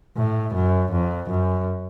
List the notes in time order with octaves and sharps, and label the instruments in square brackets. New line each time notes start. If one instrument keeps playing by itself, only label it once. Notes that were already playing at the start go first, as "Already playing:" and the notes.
[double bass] A2
F#2
F2
F#2